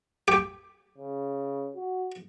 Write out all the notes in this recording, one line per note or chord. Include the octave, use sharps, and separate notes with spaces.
G4
C#3
F#4